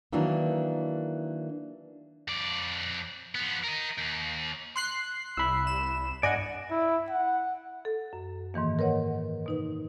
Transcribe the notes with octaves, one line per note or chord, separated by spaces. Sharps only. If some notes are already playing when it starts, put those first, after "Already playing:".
D#3 E3 F#3 A#3 D4
F2 D5
F3 B3
A#4 D#5
D#2
C6 F#6 C7
C2 B5 E6
E7
G2 D5 D#5 F#5 G#5
E4
F#5
A4
F#2
G#2 D#3 E3 A#3
A#4 B4 C#5 D#5 F#5
B2 D#4 B4